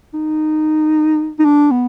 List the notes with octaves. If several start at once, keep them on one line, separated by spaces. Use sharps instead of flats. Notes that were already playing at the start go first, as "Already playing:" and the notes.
D#4
D#4
D4
B3